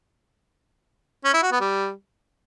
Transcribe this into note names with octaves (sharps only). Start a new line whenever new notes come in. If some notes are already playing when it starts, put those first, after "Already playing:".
C#4
E4
F#4
B3
G3